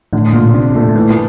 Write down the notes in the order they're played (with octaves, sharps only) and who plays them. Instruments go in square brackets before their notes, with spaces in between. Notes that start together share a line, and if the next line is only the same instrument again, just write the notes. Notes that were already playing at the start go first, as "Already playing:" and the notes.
[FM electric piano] A2 [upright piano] D3
[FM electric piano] A#2 [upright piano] F4
[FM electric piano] C3 [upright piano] D4
[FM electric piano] C3
[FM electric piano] A#2 [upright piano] A3
[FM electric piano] A#2
[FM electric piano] A2 [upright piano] E3
[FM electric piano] A#2